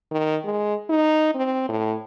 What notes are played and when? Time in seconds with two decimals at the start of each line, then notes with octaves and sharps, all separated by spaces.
0.11 D#3
0.45 G#3
0.90 D#4
1.35 C4
1.69 A2